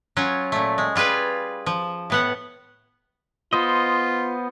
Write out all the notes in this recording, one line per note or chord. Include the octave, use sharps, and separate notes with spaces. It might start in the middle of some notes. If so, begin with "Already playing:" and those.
F#3 C#4 F4
A#2 A3
G#3
G3 F4 G#4 B4 F5
F3
A2 B3 F#5
B3 F4 C5 D#5